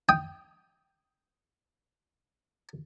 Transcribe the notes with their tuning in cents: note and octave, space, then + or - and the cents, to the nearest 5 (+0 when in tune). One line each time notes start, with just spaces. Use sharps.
G5 +0 D#6 +0